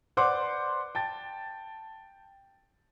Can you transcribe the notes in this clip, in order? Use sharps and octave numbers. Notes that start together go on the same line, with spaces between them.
B4 C5 D5 F#5 C6 D6
G5 A5 A6